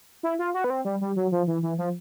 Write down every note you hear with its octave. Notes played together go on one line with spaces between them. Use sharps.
E4
F4
F#4
B3
C4
G3
G3
F#3
F3
E3
E3
F3